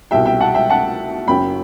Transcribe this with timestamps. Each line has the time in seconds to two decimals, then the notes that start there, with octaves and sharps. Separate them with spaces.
0.11 C2 B2 G3 E5 G5
0.25 E5 G5
0.40 F#5 A5
0.55 E5 G5
0.70 F#5 A5
1.28 F#1 F#2 F#3 G5 B5